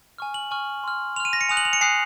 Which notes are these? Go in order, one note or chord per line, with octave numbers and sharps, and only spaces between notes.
G#5 C#6 F6
F#7
G#5 C#6 F6
C6 F6
C6 F6 D#7 F7
A#6
C#7
G#5 D#6 F#6 F7
F#7
F7
C#7
G#5 D#6 F#6 C7